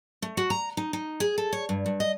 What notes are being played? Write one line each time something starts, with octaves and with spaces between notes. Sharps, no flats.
A3
F#4
A#5
D#4
D#4
G#4
A4
C#5
G2
G2
D#5